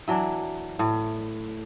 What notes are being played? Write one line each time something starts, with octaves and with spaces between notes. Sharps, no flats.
E3 F#3 D4
A2